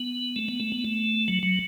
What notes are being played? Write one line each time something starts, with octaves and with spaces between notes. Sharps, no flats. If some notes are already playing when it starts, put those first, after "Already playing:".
Already playing: B3
A3
B3
A3
B3
A3
F#3
F#3